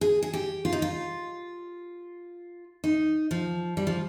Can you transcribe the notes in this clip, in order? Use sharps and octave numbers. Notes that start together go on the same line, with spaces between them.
G#4
G#4
G4
F4
D#4
F4
D#4
F3
G3
F3